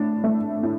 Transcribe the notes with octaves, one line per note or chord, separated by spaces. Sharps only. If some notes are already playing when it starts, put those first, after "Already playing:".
Already playing: A2 D4
A3
A2